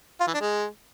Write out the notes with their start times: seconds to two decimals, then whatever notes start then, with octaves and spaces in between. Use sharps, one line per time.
0.21 F4
0.27 E3
0.34 D4
0.41 G#3